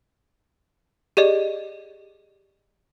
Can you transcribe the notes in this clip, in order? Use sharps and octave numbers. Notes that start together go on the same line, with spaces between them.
G4 G#4 D5 D#5